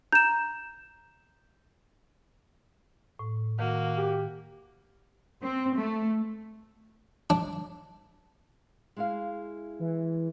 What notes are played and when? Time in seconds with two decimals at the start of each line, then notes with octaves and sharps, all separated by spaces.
0.12 A#5 G6 E7
3.19 A2
3.59 D#3 A#3 F#4
3.97 G4
5.42 C4
5.76 A3
7.30 D4
8.97 G#3 E4 F5
9.80 E3